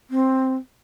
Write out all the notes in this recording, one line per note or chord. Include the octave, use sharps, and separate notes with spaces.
C4